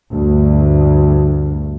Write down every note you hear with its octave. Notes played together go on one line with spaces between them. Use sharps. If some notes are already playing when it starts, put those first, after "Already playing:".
D2 G2